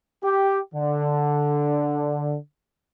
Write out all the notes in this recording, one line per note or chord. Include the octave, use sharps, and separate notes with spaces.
G4
D3